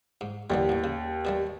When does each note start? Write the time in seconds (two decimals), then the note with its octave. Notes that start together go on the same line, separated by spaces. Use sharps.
0.21 G#2
0.50 D#2 D3 E3 G3
0.69 B1 A2
0.84 C#3
1.25 B2 G3 A3